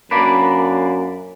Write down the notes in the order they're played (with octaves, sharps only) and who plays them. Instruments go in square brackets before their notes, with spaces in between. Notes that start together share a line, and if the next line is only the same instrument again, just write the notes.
[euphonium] F#2 [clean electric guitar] A#3 D4 B4